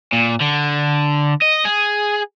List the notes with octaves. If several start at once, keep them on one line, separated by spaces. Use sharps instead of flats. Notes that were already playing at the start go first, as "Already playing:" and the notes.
A#2
D3
D#5
G#4